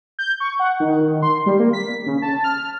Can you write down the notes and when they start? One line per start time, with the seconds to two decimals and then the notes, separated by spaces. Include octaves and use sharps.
0.19 G6
0.40 C#6
0.59 F#5
0.80 D#3
1.01 D#3
1.22 C6
1.46 G3
1.59 A#3
1.73 B6
2.06 C#3
2.22 A5
2.44 F6